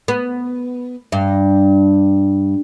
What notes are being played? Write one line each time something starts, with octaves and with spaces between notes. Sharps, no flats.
B3
G2